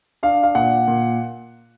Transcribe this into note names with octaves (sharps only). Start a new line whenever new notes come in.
D4 F5
F5
A#2 F#5
A#2